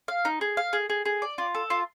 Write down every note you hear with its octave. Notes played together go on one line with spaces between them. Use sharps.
F5
D#4
G#4
F5
G#4
G#4
G#4
D5
F4
A4
F4